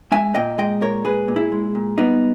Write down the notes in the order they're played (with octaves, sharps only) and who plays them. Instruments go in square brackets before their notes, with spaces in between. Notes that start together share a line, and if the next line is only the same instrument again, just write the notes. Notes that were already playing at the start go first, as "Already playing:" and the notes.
[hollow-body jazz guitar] G#3 E5 G#5
A#2 D#5 G5
G#3 D#5 G5
A#2 A#4 C#5
G#3 G#4 B4
A#2
E4 G#4
G#3
A#2
G3 B3 D#4